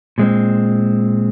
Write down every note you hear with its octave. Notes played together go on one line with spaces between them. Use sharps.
A#2 G#3 C4